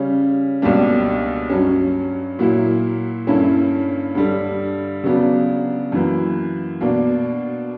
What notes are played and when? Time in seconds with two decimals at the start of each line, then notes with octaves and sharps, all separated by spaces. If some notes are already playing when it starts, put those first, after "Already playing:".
Already playing: C#3 G3 C#4
0.62 C#2 B2 G3 A#3 D4
1.50 G2 F#3 C#4
2.39 A#2 F#3 A#3 E4
3.27 G2 D3 A#3 C#4 E4
4.15 G2 D3 G3
5.04 C#3 F#3 B3 D4
5.92 F#2 E3 A#3
6.81 B2 A#3 D4